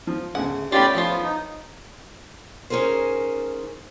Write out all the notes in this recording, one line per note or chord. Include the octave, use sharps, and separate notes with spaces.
F3
D2 C#3 F#5
A3 C#4 F4 G4 D5 F5 B5
F3 B3 F4
D#4
C#4 D#4 G#4 A#4 C5